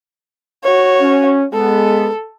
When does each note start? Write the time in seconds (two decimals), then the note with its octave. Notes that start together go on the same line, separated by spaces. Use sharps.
0.64 F#4 C#5
1.01 C#4
1.53 G#3 B3 A4